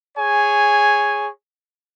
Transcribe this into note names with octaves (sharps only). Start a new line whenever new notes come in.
G#4 C#5 G#5